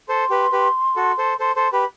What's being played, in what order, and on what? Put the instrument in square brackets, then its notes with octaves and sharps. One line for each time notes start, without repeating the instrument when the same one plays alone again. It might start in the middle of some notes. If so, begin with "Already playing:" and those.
[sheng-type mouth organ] A4 C5 [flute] C6
[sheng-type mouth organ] G4 B4
G4 B4
F#4 A4
A4 C5
[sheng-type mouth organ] A4 C5 [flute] C6
[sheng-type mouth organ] A4 C5 [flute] C6
[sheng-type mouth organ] G4 B4 [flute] B5